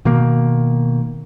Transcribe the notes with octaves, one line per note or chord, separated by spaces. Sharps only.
B2 D#3 A#3